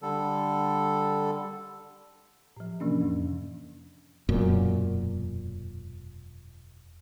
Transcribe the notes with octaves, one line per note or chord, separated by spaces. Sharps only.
D3 G3 A4
A2 F3
C3 E3 F3 A#3 C#4 D4
F2
E1 F#2 A#2